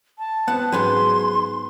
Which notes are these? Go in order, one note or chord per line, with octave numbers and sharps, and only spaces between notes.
A5
B3 C4 F#5
G#2 F#3 B3 C#4 B4 G#5 C6